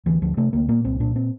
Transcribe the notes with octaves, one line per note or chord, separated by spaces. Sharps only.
D2 E3
D2 F3
C3 A3
D2 A#3
A#2 A#3
C2 C4
A#2 D4
C4